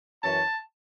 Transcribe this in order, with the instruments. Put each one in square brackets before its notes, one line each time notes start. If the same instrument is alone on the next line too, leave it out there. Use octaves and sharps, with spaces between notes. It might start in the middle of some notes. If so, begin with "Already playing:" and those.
[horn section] F#2 E3 C#4 A5